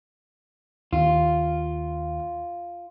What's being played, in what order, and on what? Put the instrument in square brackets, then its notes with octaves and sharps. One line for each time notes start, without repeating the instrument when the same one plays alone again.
[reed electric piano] D#2 [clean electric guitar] F4